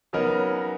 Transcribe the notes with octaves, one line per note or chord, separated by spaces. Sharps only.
C#3 F#3 B3 D#4 A#4